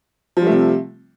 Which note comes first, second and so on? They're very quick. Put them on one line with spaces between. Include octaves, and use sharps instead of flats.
F3 G3 A3 C3